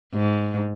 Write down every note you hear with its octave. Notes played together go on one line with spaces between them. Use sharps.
G#2